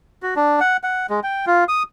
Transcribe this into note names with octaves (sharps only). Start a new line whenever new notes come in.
F#4
D4
F#5
F#5
G#3
G5
F4
D#6